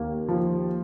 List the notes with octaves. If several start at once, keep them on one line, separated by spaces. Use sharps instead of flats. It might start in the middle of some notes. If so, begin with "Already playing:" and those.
Already playing: D#2 A#3
F3